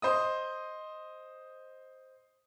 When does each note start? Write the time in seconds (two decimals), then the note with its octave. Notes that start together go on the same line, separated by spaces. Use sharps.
0.02 C5 D#5 D#6